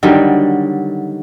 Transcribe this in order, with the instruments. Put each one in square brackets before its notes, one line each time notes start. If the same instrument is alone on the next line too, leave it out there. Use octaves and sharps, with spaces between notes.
[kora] D3 D#3 F#3 G3